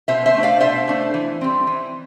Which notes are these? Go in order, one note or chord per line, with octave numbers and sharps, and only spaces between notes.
B2 C5 E5
C5 E5
A3 D4
D5 F5
B2 C5 E5
A3 D4
E3
G3 C4
E3